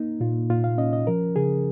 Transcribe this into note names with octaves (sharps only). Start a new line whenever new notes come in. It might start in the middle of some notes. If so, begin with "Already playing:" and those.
Already playing: A#3 D#4
A#2 F4
A#2 F4
F5
C#4 D#5
D#5
F3 A#4
C#3 G#4